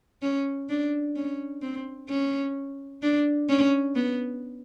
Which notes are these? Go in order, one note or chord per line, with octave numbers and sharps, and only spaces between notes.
C#4
D4
C#4
C4
C#4
D4
C#4
B3